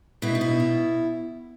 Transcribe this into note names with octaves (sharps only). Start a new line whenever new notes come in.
B2 E4
D#4
E4
B2